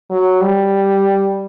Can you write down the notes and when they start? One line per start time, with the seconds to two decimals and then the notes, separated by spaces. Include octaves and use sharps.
0.10 F#3
0.41 G3